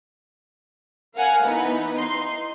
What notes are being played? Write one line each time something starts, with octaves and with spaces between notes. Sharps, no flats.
A#4 F5 F#5 G#5
E3 B3 D#4 B4
D#4 C6